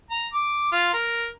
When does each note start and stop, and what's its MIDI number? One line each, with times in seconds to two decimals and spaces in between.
0.11 0.28 82
0.34 0.68 86
0.72 0.90 65
0.94 1.28 70